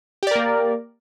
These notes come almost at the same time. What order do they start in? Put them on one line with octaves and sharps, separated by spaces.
G4 D5 A#4 A#3